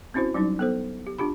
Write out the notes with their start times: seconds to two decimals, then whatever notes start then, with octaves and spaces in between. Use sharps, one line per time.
0.14 C4 C#4 E4 F#4 C5
0.34 F#3 G3 C#4 D#4
0.59 B3 A4 C5
1.07 G4
1.18 D4 F4 G4 B5